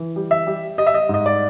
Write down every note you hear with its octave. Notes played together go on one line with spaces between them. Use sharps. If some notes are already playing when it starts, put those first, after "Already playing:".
Already playing: E3
G3
E5
G3
G3 D#5
E5
D#5
G#2
D#5
D5